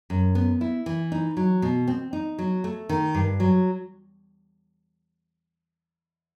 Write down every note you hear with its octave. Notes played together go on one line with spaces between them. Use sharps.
F#2
B3
E4
E3
D#4
F#3
B2
C4
D#4
F#3
A3
D#3
G2
F#3